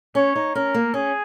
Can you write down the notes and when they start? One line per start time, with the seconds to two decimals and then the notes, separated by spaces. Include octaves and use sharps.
0.15 C#4 C#5
0.35 D#4
0.55 C#4 A#4
0.74 A#3
0.94 C#4 G#4